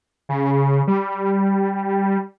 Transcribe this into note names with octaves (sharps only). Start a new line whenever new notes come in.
C#3
G3